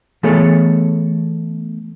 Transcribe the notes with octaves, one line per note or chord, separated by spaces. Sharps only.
E3 A3 B3 G#4 A4 C#5